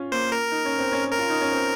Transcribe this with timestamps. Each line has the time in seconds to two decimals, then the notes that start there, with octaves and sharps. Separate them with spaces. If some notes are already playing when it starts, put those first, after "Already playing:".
Already playing: C#4 F4
0.12 A#3 C5
0.32 A#4
0.52 D#4
0.65 C#4
0.79 C4
0.92 C#4
1.12 A#4
1.19 F4
1.30 D#4
1.41 C#4
1.52 C4